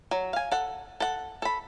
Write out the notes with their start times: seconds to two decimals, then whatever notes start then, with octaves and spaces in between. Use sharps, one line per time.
0.11 F#3
0.33 F5 G#5
0.52 A4 F#5
1.00 A4 F#5
1.42 A4 B5